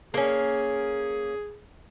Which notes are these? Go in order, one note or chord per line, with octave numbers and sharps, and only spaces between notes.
A#3 C#4 G#4